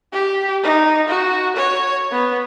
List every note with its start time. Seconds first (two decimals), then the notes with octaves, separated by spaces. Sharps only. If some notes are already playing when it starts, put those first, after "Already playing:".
0.13 G4
0.64 D#4
1.08 F#4
1.56 C#5
2.11 B3